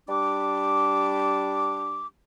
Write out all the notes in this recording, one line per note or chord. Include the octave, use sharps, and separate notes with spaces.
G3 D4 D6